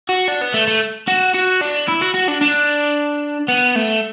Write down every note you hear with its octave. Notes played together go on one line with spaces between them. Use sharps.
F#4
D4
B3
A3
A3
F#4
F#4
D4
E4
F#4
F#4
D4
D4
B3
A3